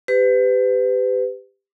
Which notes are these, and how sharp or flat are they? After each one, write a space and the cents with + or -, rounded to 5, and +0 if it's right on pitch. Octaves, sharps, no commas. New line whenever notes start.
G4 +10 B4 +35